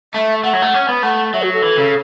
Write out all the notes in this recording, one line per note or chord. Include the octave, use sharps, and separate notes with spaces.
A3 E5
A3 F#5
F#3
A3
C#4
B3
A3 F#5
F#3 E5
F#4
A4
E3
C#3